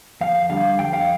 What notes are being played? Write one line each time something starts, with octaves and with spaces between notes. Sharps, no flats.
F2 F5
D3 G3 F5
F2 G5
F5